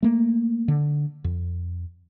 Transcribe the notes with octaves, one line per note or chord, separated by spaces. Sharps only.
A3 A#3
D3
F2